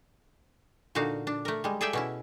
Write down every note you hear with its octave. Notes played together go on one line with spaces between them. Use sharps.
A#2 D3 D#4 F#4 F5
D4
A3 A#4
G3 G#3
G#4 A4 D5 E5 G5
B2 C#4 E4